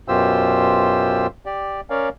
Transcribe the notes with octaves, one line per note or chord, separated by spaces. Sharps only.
F#2 B2 F4 G4 C5 E6
G4 D5
C#4 A#4 C#5 D5 F5